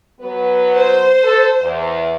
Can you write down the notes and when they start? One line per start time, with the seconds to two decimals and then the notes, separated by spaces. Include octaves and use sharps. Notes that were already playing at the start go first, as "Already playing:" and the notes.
0.21 F#3 B3 B4
0.74 C5
1.24 A4
1.61 E2